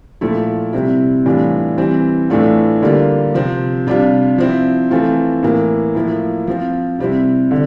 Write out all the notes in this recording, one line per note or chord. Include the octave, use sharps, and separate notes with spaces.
A#2 F3 A3 E4
C3 G3 C4 E4
A2 E3 G3 D4 F4
E3 G3 C4
A2 E3 A3 D4 F4
D3 G3 A#3 F4
C3 F3 C4
C3 G3 D4 F4
F3 C4 E4
E3 A3 C4 F4
A2 E3 A#3
A2 F3 A#3 E4
F3 C4 F4
C3 G3 C4 E4
D3